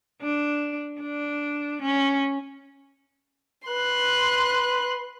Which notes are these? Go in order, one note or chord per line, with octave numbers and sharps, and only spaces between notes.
D4
D4
C#4
B4 C6 F#6